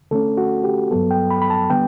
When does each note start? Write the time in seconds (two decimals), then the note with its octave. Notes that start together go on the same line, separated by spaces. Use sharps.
0.11 D3 A3 C#4 A4
0.38 F#4
0.64 G4
0.91 G2 F#3 B3 A4
1.11 G5
1.31 B5
1.42 B5
1.50 A5
1.70 D3 G3 B3 G5